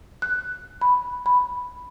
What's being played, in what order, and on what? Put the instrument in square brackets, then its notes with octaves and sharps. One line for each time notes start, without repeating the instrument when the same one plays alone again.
[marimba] F#6
B5
B5